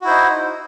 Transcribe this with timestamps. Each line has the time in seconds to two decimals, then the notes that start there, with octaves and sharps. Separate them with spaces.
0.01 F#4
0.04 E4
0.07 C5
0.10 D#4